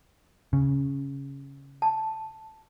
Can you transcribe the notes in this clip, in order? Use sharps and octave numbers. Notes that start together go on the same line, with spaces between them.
C#3
A5